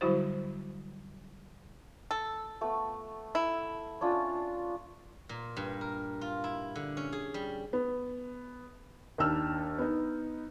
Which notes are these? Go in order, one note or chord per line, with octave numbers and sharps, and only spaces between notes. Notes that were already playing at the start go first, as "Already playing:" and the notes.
D3 F#3 G3 E4 F#4 C5
A4
A3 B3
E4
C#4 D4 F4
A#2
G2
A#4
F4
E4
D3
C#4
G#4
G3
B3
D#2 D4 D#4 E6 F6
B3 D#4